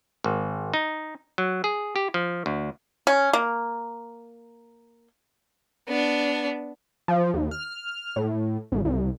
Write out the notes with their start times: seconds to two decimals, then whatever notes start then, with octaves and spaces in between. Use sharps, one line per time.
0.24 G#1
0.74 D#4
1.38 F#3
1.64 G#4
1.96 G4
2.14 F3
2.46 D2
3.07 C#4
3.33 A#3
5.88 B3 D4
7.08 F3
7.34 D#2
7.51 F6
8.16 A2
8.72 G#1
8.85 C2